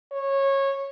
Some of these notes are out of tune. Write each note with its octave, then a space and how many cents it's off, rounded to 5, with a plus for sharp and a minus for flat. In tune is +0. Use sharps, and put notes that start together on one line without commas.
C#5 -15